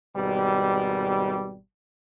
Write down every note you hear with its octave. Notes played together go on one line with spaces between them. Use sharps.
G#1 B2 G3